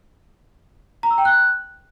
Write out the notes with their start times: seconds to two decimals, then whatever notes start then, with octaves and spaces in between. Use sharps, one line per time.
1.03 A#5
1.11 E6
1.18 G5
1.25 F#6